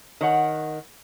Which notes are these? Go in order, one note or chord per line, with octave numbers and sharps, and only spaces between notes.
D#3 C#5 F#5